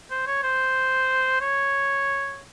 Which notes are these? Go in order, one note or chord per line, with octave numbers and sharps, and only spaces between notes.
C5
C#5
C5
C#5